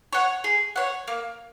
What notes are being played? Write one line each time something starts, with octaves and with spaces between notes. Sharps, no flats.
C#5 F#5
G#4
C#5 F#5
A#3